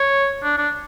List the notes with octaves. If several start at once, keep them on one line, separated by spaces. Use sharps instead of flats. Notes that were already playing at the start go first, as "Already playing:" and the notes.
Already playing: C#5
D4
D4